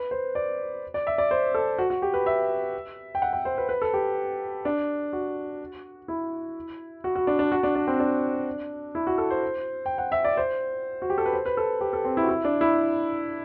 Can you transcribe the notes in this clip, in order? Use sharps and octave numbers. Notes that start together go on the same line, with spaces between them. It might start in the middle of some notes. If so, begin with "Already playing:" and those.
Already playing: B4
C5
D5
D5
E5
D5
C5
A4
F#4
F#4
G4
B4
E5
G5
F#5
G5
C5
B4
B4
A4
G4
D4
F#4
E4
F#4
F#4
D4
D4
F#4
D4
D4
C4
D4
E4
F#4
A4
C5
G5
F#5
E5
D5
C5
F#4
G4
A4
B4
C5
B4
A4
G4
A4
C4
E4
F#4
E4
D4
E4